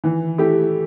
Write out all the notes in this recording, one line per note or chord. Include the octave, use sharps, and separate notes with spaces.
E3
A3 E4 G4